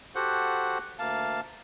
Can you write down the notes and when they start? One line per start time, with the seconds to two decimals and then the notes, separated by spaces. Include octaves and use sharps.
0.15 F#4 G4 A4 C5 F#5
0.99 D2 A#3 F5 A5